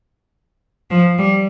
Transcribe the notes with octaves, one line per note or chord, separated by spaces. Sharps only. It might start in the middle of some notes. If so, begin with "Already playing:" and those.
F3
G3